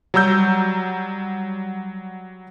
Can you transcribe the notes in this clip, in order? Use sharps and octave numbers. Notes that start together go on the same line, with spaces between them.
F#3 G3 A#5 E6 G6